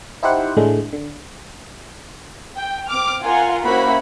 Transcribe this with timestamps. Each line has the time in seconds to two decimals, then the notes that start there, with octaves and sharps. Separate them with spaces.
0.23 D#4 E4 G4 C5 F#5
0.57 A2 D3 G#3 A3
0.93 D3
2.56 G5
2.88 C4 D6 F6
3.23 F4 A#4 F#5 G#5
3.64 A#3 C#4 E4 F#4 C5 B5